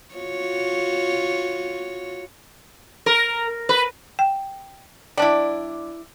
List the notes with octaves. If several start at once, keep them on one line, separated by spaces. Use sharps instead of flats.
F4 F#4 C#5
A#4
B4
G5
G3 D4 E4 D5